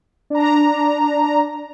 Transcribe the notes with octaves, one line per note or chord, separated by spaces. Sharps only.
D4 A#5